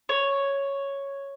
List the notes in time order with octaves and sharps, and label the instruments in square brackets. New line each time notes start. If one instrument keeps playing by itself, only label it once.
[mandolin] C#5